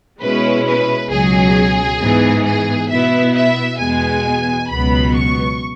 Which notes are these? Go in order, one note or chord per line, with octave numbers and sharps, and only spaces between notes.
B2 G#3 C#4 E4 B4
B4
C#2 B2 F#3 G#4
G#2 E3 B3
G#4
B2 B3 E4 E5
E5
E2 B2 G#3 B3 G#5
C#2 B2 F#3 B3 B5
C#6